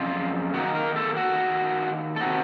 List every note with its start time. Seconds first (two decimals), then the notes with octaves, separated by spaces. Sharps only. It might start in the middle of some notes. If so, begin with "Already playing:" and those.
Already playing: F2 C#3 F#3 F4
0.54 D#3 A#3 D#4 F#4
0.75 A#4
0.96 A4
1.16 F#4
2.16 A4
2.20 C3 D#3 A3 C4 F#4